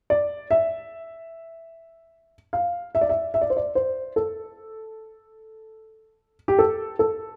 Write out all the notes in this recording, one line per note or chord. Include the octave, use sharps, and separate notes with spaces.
D5
E5
F5
E5
D5
E5
E5
D5
C5
D5
C5
A4
G4
A4
A4